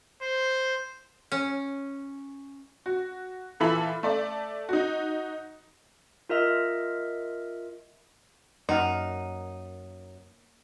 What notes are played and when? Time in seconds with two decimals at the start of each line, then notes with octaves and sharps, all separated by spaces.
0.22 C5
1.32 C#4
2.86 F#4
3.60 A#2 E3 A4 E5 B5 F#7
4.03 A3 D5 E5
4.69 D#4 F#4
6.29 F4 A#4 D#5 E5
8.69 F#2 A#3 D#4 F#5 F6